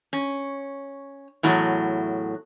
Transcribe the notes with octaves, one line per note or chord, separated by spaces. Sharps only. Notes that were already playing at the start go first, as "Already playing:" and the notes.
C#4
E2 A2 F#3